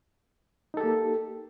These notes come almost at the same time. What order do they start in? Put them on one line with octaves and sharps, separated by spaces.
D#4 A4 G4 A#3